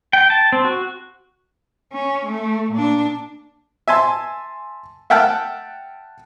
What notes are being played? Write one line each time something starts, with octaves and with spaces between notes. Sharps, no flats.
G5
A5
C4
F#4
C#4
A3
A#2 D4
E5 G#5 A5 C6
E5 F#5 G5 A5 F6 F#6